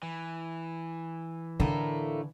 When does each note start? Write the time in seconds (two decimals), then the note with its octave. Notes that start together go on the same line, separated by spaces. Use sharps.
0.03 E3
1.60 A2 D3 A3 A#3